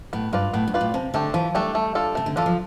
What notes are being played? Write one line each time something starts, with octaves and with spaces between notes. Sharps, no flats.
A2 B3
G2 F4 B4 D5
A2 B3
G2
F4 B4 D5
A2
C3 F3
D3 A3 D4 G4
E3 F3
G3 A3 D4 G4
A3
D4 F4 A4
C3 A3
D3
E3 D4 F4 A4
F3